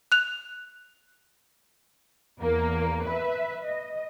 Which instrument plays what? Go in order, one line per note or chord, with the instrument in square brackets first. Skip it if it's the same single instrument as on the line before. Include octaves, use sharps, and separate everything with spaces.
[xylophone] F#6 F7
[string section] E2 A#3
B4 E5
D#5